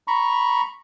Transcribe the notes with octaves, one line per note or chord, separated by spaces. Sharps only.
A#5 B5 C#6